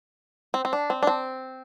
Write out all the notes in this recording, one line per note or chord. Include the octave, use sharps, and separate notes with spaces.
C4
C4
D4
C4
D4
C4